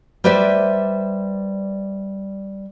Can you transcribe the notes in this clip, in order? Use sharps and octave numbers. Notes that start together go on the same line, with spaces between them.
G3 B4 C5 D5 E5